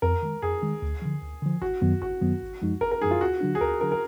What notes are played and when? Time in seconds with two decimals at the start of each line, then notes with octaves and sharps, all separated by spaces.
0.02 F2 A#4
0.22 D#3 G#3
0.42 F2 G#4
0.62 D#3 G#3
0.82 D2
1.02 D3 F3
1.22 D2
1.42 D3 F3
1.62 G#1 F#4
1.82 F#2 D#3 F#3 B3
2.01 G#1 F#4
2.21 F#2 D#3 F#3 B3
2.42 G#1
2.62 F#2 F3 G#3 D#4
2.81 G#1 A#4
2.92 A#4
3.02 F#2 F3 G#3 D#4 G#4
3.11 F4
3.21 D2 F#4
3.41 D3 F#3 D4
3.55 G#4
3.61 D2 A#4
3.81 D3 F#3 D4 A#4
3.92 A#4